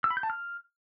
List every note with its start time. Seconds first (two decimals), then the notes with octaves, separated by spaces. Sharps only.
0.04 E6
0.11 B5
0.17 G6
0.23 A5
0.30 F6